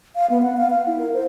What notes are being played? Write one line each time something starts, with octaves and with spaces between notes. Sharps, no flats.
F5
B3
F#5
F5
F5
E4
A#4
C5